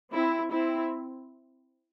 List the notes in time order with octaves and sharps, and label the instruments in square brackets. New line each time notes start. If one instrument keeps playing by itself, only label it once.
[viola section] C4 E4
C4 E4